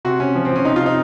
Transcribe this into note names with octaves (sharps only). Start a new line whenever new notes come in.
C3 F#4
C3 C#4
F3
C4
F3
C#4
C3 D#4
F4
C3
D#4